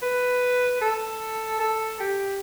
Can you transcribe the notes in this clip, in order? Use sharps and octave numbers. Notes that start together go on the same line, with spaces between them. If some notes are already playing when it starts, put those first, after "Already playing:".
B4
A4
A4
G4